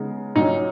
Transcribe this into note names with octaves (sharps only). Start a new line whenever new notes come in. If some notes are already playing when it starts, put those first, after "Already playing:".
Already playing: C#3 G#3 B3 D#4
A#2 F#3 C#4 D#4